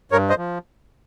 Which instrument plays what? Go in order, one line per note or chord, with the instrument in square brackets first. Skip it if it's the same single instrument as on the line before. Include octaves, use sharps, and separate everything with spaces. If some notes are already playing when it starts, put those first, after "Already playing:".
[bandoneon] G2 A#4 C#5
C5 D#5
F3